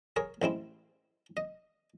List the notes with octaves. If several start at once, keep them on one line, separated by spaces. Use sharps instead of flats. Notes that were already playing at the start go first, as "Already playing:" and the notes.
G#4 A#4 C#5
A1 G#3 C4 E4
D#5